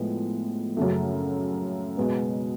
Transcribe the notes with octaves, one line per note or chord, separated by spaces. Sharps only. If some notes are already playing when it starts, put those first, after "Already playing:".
Already playing: A2 F3 G#3 B3
F#2 C#3 F#3 A3
B2 G#3 B3